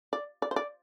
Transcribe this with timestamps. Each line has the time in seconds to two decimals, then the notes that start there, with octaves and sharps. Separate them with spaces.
0.13 D5
0.42 D5
0.51 C5
0.56 D5